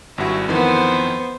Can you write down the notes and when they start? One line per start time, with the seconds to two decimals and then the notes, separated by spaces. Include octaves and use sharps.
0.18 G#1 G2 E4 F#4
0.48 F2 D#3 E3 B3 C5